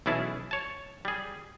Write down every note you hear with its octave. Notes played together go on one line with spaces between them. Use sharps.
B1 E3 C#4 E4 G#4 A5
C#5 A5
G3 G#4